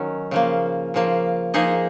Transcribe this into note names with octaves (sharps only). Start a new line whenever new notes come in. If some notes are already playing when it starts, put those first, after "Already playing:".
Already playing: D#3 F#3 C#4
C#3 F3 A#3
C#3 F3 A#3
F3 A#3 D#4 G#4 D#5